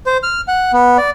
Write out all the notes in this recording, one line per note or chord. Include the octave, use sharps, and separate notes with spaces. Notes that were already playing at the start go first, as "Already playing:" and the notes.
C5
F6
F#5
B3
D5